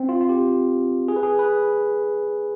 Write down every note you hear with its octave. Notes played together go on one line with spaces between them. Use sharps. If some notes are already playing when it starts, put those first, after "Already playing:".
Already playing: C4
F4
F4
G4
G#4
B4
G#4
B4